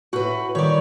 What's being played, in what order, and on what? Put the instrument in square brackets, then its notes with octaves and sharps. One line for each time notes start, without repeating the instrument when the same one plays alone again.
[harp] A2 [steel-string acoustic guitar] F#4 B4
[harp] D#3 G3 [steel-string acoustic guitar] C#5 D5